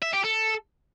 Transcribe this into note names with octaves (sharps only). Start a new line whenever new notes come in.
E5
G4
A4